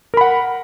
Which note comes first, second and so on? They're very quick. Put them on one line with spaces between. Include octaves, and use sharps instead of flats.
A#4 B5 F#5